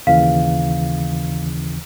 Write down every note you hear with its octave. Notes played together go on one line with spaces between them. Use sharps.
D#2 C#3 E3 F5